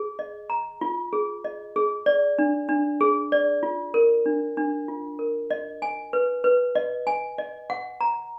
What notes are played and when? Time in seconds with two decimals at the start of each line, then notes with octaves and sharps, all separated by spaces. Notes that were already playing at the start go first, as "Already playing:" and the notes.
Already playing: G#4
0.19 D#5
0.50 A#5
0.81 F4
1.13 G#4
1.44 D#5
1.76 G#4
2.06 D5
2.39 D4
2.69 D4
3.01 G#4
3.32 D5
3.63 F4
3.94 A#4
4.26 D4
4.57 D4
4.88 F4
5.19 A#4
5.51 D#5
5.82 G#5
6.13 B4
6.44 B4
6.75 D#5
7.07 G#5
7.38 D#5
7.70 F#5
8.01 A#5